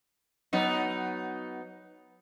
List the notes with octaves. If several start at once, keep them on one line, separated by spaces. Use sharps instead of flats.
F#3 B3 D#4